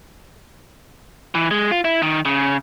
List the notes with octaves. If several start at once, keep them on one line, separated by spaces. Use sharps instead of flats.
E3
G#3
F4
E4
D#3
C#3